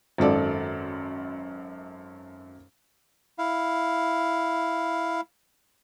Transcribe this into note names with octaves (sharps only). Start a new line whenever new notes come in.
G#1 F#2 A4 D5
E4 F5